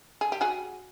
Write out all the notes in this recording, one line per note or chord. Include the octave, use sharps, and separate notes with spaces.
G#4
G4
F#4 G#4